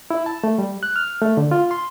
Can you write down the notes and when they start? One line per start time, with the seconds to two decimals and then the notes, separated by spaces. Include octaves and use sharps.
0.10 E4
0.26 A5
0.44 A3
0.58 G3
0.83 F#6
0.96 F6
1.22 A3
1.37 D3
1.51 F4
1.71 C6